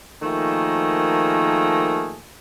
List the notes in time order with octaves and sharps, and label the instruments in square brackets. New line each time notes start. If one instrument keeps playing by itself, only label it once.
[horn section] D#3 F3 A3 A#3 G#4